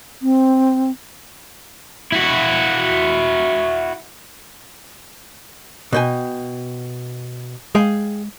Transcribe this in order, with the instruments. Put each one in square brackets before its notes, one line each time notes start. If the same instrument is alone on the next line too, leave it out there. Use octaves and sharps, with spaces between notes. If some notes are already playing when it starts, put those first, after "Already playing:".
[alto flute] C4
[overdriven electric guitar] E4 F#4
[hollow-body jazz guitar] B2 G5 G#5
[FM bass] G#3 [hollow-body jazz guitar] G#4 F5 G5